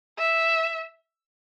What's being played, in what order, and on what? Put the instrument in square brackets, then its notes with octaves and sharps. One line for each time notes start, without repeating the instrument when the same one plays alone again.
[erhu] E5